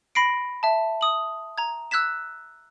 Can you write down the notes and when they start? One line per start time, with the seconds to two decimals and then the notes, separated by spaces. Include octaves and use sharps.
0.15 B5 A#6 C7 D7
0.63 E5 A5
1.01 D#6 F#7
1.58 A#5 G#6
1.91 E6 F#6 G#6 B6 E7